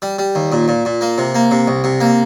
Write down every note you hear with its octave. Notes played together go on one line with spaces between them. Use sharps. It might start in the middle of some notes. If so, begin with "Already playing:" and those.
G3
G3
D#2
A#2
A#2
A#2
A#3
C3
A#3
C3
C2
C3
A#3